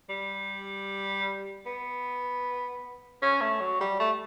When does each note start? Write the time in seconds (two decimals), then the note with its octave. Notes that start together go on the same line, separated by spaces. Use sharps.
0.09 G3
1.66 B3
3.22 C#4
3.41 A3
3.60 F#3
3.81 G3
4.00 A3